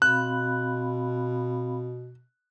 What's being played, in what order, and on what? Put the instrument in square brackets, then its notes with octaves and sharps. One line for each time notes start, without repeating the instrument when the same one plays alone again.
[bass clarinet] B2 [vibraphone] C4 F5 B5 [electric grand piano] F#6